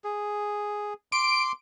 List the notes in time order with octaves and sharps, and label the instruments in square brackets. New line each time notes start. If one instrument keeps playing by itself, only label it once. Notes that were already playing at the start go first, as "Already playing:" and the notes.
[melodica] G#4
[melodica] C6 D6 [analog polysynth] D7